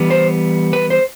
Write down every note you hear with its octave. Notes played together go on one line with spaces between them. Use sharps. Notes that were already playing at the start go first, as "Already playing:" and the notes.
Already playing: E3 G3 B3
C5
B4
C5